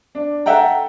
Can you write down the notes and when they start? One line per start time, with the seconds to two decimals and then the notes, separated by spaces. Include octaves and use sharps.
0.15 D4
0.46 A4 E5 F#5 G5 A#5